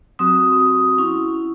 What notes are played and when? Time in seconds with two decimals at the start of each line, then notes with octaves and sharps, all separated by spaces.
0.19 F#3 C4 F#4 D#6
0.59 D#6
0.98 F#3 C#4 E4